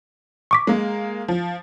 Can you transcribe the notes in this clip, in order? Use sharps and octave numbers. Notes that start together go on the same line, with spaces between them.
C#6 D6 B6
G#3 A#3
F3